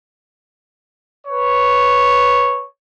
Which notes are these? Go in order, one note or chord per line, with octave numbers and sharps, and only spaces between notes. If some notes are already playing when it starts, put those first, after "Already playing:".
B4 C#5